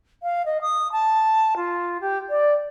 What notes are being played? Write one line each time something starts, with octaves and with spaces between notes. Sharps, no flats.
F5
D#5
D#6
A5
F4
G4
D5